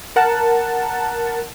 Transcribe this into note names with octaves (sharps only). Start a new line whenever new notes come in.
A#4 F#5 A5